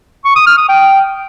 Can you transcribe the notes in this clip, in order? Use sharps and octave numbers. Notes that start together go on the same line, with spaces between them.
C#6
D#6
F6
D#6
G5